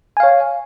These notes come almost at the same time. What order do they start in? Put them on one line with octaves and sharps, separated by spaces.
G#5 F5 C#5